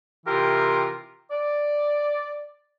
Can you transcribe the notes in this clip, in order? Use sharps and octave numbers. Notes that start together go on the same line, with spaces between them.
C3 E3 F4 G4 A#4
D5